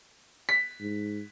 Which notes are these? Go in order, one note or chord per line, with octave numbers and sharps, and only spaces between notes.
B6
G#2